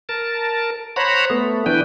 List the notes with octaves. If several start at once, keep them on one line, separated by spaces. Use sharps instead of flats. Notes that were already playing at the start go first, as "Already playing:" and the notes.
A#4 A5
C5 C#5 F#5 A#5 B5
A3 B3
E3 D4 B4 G5